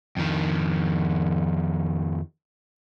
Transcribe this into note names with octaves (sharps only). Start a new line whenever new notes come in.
F2 D#3